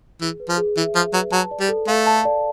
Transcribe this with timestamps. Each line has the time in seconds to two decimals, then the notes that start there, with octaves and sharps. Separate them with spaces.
0.21 E3 G#4
0.40 B4
0.49 F3
0.58 G#4
0.77 E3 E5
0.95 F3 G#4
1.13 F#3 B4
1.32 F#3 A5
1.51 D5
1.60 G3
1.69 A4
1.88 A3 F5
2.07 A5
2.25 D5